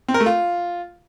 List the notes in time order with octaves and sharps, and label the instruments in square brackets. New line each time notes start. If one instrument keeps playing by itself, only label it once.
[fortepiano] C4
A#4
A3
F4